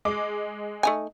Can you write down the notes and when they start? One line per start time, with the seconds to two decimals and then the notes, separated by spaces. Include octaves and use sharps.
0.05 G#3 D6
0.83 A3 D#4 G#5